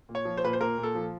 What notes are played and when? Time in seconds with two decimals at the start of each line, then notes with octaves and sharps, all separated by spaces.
0.09 A#2
0.15 C#5
0.25 F3
0.37 C5
0.44 A#2 B4
0.53 C5
0.61 A#2 A#4
0.78 A#2
0.83 A4
0.95 F3